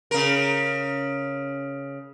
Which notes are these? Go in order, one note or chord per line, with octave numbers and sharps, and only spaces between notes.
C#3 A#4